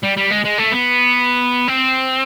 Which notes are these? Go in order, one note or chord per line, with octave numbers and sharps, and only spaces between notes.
G3
G3
G#3
G#3
A3
B3
C4